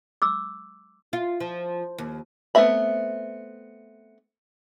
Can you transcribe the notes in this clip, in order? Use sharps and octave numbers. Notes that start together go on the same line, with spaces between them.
D6 E6
F4
F3
D#2
A3 B3 C4 E5 B5